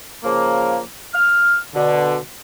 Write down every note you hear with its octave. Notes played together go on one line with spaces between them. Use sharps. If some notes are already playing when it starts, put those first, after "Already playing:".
C#3 F3 A#3
F6
B2 D3